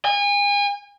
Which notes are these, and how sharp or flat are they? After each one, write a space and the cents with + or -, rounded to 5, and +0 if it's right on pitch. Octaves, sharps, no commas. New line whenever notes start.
G#5 -35